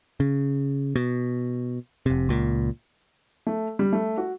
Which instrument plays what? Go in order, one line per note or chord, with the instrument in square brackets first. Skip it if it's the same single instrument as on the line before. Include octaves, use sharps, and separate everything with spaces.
[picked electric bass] C#3
B2
F1 C3
C#2 A#2
[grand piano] A3
G3
A3
F#4